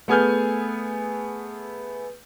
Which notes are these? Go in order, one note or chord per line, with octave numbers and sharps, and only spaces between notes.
A3 B3 G#4 G#5 F6 G6